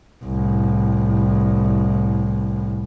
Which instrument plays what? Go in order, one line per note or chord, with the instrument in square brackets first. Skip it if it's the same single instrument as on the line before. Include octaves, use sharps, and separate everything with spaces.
[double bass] C2 A2